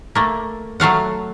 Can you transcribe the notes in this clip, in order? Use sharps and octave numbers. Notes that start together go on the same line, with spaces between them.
A3 A#3
F#3 A3 F5 F#5